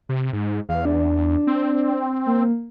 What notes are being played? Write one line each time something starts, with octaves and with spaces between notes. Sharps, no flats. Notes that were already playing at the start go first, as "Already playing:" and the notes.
C3
G#2
E2 F5
D4
C4
A#3